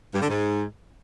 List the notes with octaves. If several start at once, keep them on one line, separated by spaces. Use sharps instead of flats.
G2
D3
G#2